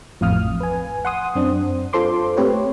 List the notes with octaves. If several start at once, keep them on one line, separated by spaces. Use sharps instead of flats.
A1 F2 A2 F5 D#6 F6
B4 G#5
F#5 C6 D#6
F#2 C4 D4
F4 A4 C5 C6 D6
A3 C4 G4 B4 C#5